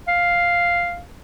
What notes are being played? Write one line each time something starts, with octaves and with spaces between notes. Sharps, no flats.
F5